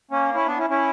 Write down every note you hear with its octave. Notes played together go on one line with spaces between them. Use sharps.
A#3 C#4
C#4 E4
B3 D4
C#4 E4
C#4 E4